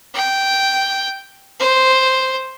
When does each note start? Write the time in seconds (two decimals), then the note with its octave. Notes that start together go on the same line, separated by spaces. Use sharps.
0.14 G5
1.60 C5